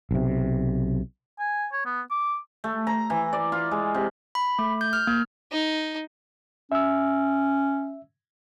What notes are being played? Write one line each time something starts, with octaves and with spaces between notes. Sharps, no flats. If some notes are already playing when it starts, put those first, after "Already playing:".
B1 C3
G#5
C#5
B3
D6
A3
A#5
E3
D5
F4
G#3
C3
B5
A3
G6
F6
A#3
D#4
C#4 E5 E6